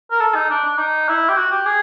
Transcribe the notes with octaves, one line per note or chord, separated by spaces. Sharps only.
A#4
A4
D#4
D4
D4
D#4
E4
G4
F#4
G4
G#4